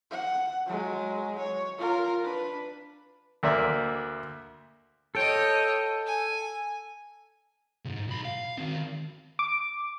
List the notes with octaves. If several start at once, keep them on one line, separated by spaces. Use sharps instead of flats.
F#5
F#3 G#3
C#5
F4 A#4
D4 B4
D2 A#3 D5 E5
A4 C#5 D#5 G5
G#5
C#2 G#2
B1 B5
F5
D#3 C4
D6